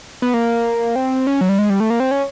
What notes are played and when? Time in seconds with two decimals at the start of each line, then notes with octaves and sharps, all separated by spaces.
0.22 B3
0.34 A#3
0.96 C4
1.27 C#4
1.41 F#3
1.49 G3
1.59 G#3
1.70 G3
1.80 A3
1.90 A#3
2.00 C4
2.11 C#4